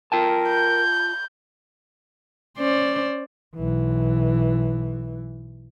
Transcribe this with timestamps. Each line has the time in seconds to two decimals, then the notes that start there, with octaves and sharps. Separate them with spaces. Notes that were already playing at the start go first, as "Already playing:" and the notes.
0.12 F4 A#4 G5 A5
0.48 G6
2.58 C#4 C5 D5
3.56 B1 E3